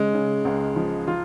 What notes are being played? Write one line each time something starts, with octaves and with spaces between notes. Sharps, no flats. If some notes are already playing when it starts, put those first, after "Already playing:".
Already playing: C#3 G#3
C#3
C#2
F3
F3 F4